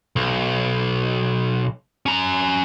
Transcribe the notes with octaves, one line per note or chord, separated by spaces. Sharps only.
B1
C#4 A#5